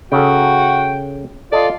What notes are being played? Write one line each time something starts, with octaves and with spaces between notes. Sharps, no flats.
C#3 F#4 A4 G5
F4 A4 D5 D#5